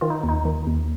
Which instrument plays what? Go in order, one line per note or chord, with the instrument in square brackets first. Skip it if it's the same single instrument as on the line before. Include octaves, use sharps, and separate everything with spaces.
[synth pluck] D#3 F4
D#4
D#2
D#4
D#3
D#2